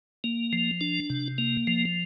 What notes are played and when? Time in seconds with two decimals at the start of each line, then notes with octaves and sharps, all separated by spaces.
0.24 A#3
0.53 F3
0.81 D4
1.10 C3
1.38 A#3
1.67 F3